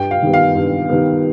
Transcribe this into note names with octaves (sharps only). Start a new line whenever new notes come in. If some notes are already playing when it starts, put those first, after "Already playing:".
Already playing: G2 G5
F5
D#3 G3 B3
F5
G2
D#3 G3 B3